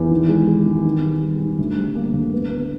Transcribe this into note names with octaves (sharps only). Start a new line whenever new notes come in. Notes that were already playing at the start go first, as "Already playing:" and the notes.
Already playing: E2
D#3
G#3
G#3
D#3
D#3
G3
G3
D#3
D2
G3
A#3
D2
B3
B3